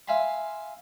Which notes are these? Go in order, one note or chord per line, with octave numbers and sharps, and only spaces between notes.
E5 F5 G#5 B5 C6